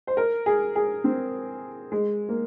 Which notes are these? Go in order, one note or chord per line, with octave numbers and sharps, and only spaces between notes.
C5
A#4
G#4
G#4
C4
G#3
A#3